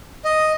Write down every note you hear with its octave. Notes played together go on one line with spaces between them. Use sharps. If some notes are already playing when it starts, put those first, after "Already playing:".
D#5